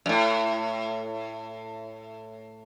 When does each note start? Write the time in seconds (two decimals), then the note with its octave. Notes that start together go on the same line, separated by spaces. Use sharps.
0.06 F#2 A2